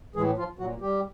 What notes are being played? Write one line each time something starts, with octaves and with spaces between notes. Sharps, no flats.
A2 E3 G#3 G#4
F3 F4
A#2 F#3 F#4
G3 G4